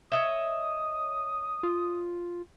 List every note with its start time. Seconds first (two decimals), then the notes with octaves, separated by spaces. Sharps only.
0.12 C#5 D#5 E5 D#6
1.63 F4